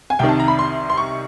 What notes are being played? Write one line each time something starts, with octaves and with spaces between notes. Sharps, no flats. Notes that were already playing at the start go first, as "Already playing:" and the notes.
G#5
C2 C3 D#3 G5
A5
A#5
B5
C6
C6
C#6